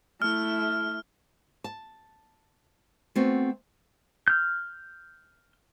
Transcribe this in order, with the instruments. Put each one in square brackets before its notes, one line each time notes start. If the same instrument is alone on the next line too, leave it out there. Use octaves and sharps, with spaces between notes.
[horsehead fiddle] A3 E4 [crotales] F6
[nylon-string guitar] A5
A3 B3 C4 F#4
[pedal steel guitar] F6 G6